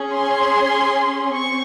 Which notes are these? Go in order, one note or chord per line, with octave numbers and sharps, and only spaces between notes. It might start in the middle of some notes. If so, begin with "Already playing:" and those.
Already playing: C#4 G#4
C6
C4 C#6